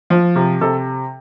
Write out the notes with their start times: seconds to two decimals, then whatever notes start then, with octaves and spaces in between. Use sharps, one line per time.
0.10 F3
0.36 C3
0.61 C3 A4